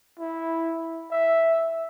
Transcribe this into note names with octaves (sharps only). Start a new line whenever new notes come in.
E4
E5